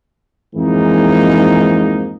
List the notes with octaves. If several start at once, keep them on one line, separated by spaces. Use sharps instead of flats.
F2 G#2 E3 G#3 A#3 D#4